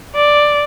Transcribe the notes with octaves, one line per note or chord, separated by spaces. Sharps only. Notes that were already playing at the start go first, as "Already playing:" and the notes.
D5